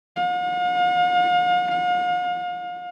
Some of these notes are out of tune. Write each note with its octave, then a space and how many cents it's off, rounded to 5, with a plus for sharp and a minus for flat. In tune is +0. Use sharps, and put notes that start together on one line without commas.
F5 +45